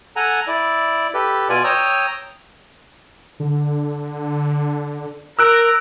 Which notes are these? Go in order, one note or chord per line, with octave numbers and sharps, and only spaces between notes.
A4 F#5 G#5 A#5
E4 D5
G4 A4 B4
B2 F4 D5 G#5
C#5 G5 A#5 D#6 E6
D3
A#4 E6 F#6 D7